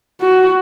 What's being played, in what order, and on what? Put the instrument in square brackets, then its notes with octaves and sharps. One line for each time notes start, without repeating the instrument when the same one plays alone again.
[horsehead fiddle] F#4